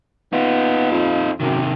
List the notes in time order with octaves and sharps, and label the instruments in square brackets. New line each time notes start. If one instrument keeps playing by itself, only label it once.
[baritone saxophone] B3 [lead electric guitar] D#4 F4
[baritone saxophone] F2
[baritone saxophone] F#2 [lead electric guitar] C3 D#3